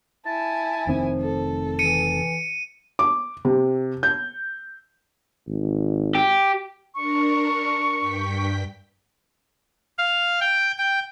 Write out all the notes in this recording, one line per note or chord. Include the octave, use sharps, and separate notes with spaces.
E4 G#5 A5
F1 D#3 F3 C4
A4
E3 C#7 D#7
D6
C3
G6
G#1
G4
D4 A#4 C#6
G2 G5 B6
F5
G5
G5